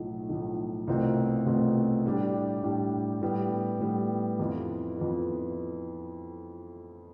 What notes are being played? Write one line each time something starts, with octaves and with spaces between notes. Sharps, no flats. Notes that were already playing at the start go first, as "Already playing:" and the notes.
Already playing: B1 A2 F3
B1 A2 F3
C2 B2 A3 C4 F4
C2 B2 A3 C4 F4
A2 G3 D4 G4
A2 G3 D4 G4
A2 G3 B3
A2 G3 B3
F2 E3 B3 F4
F2 E3 B3 F4